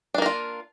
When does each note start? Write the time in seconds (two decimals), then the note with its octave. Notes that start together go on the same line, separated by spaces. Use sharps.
0.14 D4
0.18 A#3
0.22 A#4
0.26 F4